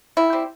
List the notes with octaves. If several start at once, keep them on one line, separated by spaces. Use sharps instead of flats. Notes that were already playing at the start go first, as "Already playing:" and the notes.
D#3 E4
G3 C4